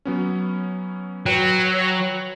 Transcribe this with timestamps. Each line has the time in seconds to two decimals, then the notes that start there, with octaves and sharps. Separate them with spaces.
0.05 F#3 B3 C#4
1.26 F#3 B4 G5